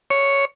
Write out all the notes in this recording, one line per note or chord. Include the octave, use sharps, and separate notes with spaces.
C#5